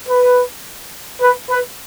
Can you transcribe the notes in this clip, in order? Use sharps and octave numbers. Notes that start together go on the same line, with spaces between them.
B4
B4
B4